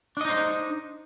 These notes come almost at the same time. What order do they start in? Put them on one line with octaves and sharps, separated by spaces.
D4 D#5 D#4 C5